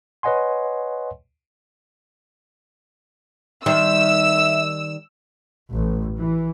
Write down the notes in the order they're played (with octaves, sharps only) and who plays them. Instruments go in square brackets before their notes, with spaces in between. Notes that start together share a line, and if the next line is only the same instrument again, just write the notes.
[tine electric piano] B4 C#5 D#5 F#5 G#5 C6
[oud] D#3 G3 C5 [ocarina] E5 [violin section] E6
[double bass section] A1
E3